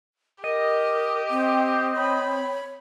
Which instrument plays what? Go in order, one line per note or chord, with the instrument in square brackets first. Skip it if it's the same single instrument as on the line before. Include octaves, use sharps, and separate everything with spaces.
[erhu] G4 [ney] A#4 [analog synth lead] D#5
[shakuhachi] C4 [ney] G5
[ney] C#5 [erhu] B5